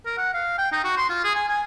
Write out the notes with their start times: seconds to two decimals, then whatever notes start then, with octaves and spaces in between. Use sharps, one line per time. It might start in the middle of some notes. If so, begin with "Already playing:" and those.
0.05 A#4
0.18 F#5
0.34 F5
0.58 G5
0.72 D#4
0.84 F#4
0.97 C6
1.09 F4
1.24 G#4
1.35 G#5
1.48 G#5